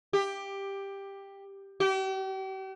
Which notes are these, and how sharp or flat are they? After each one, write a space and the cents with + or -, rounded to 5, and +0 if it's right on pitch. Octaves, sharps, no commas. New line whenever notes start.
G4 +10
G4 -40